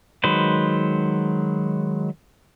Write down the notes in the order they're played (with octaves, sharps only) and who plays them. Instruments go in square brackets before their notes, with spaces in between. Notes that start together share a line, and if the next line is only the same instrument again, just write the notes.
[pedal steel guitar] D#3 F#3 G#3 B4 C5